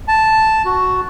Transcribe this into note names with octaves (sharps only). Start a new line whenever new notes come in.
A5
F#4